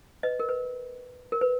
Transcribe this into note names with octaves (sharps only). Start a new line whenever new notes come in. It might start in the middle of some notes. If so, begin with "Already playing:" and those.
B4 D#5
A#4
B4
A#4
B4